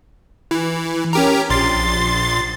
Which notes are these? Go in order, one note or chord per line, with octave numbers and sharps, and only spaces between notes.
E3
C#4 G4 A#4
A#1 C6 A6